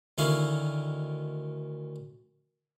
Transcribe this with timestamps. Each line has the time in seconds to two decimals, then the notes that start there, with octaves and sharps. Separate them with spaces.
0.18 D2 D#3 C#4 E4 F5